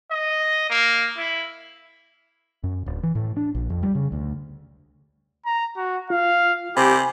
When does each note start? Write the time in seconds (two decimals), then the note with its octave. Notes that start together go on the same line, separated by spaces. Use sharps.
0.11 D#5
0.70 A#3
1.18 E4
2.64 F#2
2.86 D1
3.03 E3
3.15 A2
3.37 D4
3.55 A#1
3.70 F2
3.83 G3
3.95 C#3
4.12 D2
5.46 A#5
5.77 F#4
6.10 F4 F5
6.76 C3 G4 G#5 B5